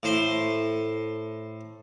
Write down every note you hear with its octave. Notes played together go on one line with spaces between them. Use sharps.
A2 C5 C6